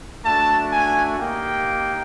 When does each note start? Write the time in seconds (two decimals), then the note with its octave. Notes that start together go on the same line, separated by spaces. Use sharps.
0.24 A3 D4 F#4 A5
0.71 G#5
1.19 A#3 D#4 G4 G5